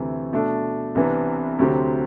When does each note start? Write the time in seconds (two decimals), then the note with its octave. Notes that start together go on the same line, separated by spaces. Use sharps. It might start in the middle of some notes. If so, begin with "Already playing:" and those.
Already playing: D2 C3 E3
0.32 B2 A3 D4 A4
0.95 C2 C3 E3 B3 D4
1.59 D2 C3 F#3 C4 G4